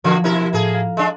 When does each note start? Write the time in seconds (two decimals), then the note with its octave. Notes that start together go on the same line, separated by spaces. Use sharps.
0.04 A2 D3 F3 F#4
0.24 B2 E4 A#4
0.53 A2 A#3 G#4
0.74 F5 A#5
0.97 G#3 D4 F#6